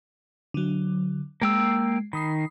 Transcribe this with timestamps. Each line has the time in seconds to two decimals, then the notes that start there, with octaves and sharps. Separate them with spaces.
0.54 D3 F#3
1.42 G#3 A#3 G5 E6 C7
2.13 D#3 B5 D#6 C7